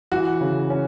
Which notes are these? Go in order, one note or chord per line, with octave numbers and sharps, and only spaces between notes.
E3 F#4
C#3
C#4